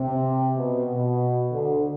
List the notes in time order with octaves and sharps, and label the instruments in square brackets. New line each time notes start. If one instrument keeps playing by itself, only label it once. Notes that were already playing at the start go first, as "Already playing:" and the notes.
Already playing: [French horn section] C3
B2
B2
D2 D3